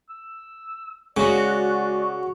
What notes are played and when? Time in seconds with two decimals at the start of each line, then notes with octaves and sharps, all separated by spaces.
0.10 E6
1.17 C#3 G#3 F#4 D5